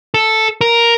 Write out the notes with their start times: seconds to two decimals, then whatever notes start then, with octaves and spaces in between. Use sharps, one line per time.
0.14 A4
0.61 A#4